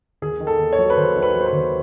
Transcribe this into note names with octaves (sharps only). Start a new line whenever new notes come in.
D#2 G#4
D#3
A4
D#2
C#5
F#3
B4
D#2 C5
D#3 C5
B4
F#3
C5
B4
D#2